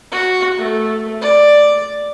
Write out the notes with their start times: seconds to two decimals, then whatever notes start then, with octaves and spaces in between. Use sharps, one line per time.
0.12 F#4
0.58 A3
1.22 D5